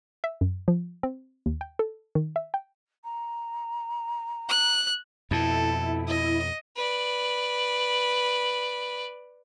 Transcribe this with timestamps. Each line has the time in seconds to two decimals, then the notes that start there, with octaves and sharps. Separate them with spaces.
0.24 E5
0.41 F#2
0.68 F3
1.03 C4
1.46 D#2
1.61 G5
1.79 A4
2.15 D#3
2.36 E5
2.54 G5
3.04 A#5
4.49 F#6
5.31 F2 B2 E4 A4
6.08 D#5
6.76 B4 D5